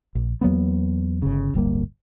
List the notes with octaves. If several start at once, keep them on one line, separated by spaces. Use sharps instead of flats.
A#1
E2 F#3 A#3 B3
G1 C#3
D1 G1 G3 A#3